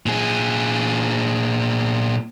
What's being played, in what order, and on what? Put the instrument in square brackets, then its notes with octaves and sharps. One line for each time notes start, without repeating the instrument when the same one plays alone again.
[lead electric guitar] A#2 G#4